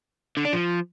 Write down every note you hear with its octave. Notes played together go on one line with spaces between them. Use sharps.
D3
D4
F3